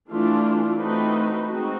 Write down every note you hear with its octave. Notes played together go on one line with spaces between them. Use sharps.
E3 A3 D4 F4
A3 C4 D#4 F#4 B4
G#3 C4 D#4 F#4